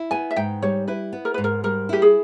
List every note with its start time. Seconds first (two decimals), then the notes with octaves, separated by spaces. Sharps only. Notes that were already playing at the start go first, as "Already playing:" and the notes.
Already playing: E4
0.11 B3 G#5
0.31 E5
0.36 G#2 G5
0.62 G3 C#5
0.88 E4 B4
1.13 B3
1.25 A#4
1.34 G#2 B4
1.44 A#4
1.64 G3 A#4
1.89 E4 G4
2.02 G#4